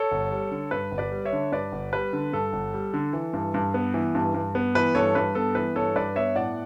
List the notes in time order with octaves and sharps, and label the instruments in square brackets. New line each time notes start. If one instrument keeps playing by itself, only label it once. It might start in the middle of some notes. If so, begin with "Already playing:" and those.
Already playing: [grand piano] A4 C#5
G1
G3
D3
G2 B4
G1
B4 D5
G3
C#5 E5
D3
G2 B4 D5
G1
G3 B4
D3
G2 A4
G1
G3
D3
E3
G2
G2
B3
E3
G2
G2
B3
E3 B4
G2 A4 C#5
G2 B4
B3 A4
E3 B4
G2 A4 C#5
G2 B4 D5
B3 C#5 E5
A2 D5 F#5